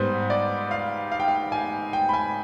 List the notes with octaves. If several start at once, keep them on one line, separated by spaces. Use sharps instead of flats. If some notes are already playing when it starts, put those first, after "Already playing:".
Already playing: G#2 G3 B3 C5
D5
F5
F5
G5
F5
G#5
G5
B5
G#5